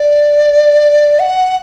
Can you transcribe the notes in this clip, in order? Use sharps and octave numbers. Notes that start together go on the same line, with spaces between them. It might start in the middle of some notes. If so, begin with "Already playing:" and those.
Already playing: D5
F#5